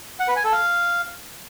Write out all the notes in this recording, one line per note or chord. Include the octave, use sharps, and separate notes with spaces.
F#5
B4
G#5
A4
F5